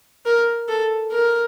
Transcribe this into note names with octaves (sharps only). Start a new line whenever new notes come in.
A#4
A4
A#4